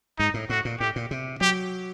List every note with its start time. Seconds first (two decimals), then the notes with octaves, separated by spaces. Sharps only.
0.19 G#2 D#4
0.34 A2
0.49 A2 F#4
0.65 A#2
0.80 A2 G4
0.96 A#2
1.11 C3
1.41 F#3 G4